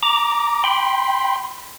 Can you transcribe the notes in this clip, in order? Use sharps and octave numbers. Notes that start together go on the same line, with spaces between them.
A#5 D6
G5 B5 C6